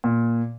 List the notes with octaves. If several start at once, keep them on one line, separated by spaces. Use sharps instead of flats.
A#2